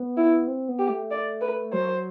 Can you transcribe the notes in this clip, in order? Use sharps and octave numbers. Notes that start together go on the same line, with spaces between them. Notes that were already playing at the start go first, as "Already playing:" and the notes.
Already playing: B3
E4
C4
B3
G4
A3
D5
B4
F#3 C5